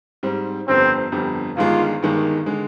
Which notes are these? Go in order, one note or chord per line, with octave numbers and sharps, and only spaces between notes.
G#2 G3 C4
G1 F2 D3 G3 C4
G1 F2 D3 G3
G1 G2 D#3 G#3 D4 F4
G1 G2 D#3 G#3 D4
D3 G#3